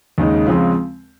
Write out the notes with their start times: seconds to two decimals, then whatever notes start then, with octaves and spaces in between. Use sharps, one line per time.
0.18 D#2 C#3 G#3 D#4
0.47 C#3 F3 G#3 C4